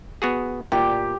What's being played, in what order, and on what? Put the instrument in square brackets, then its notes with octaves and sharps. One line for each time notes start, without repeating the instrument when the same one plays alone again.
[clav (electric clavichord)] B3 F#4 G#4
[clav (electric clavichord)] A#2 [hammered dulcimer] G4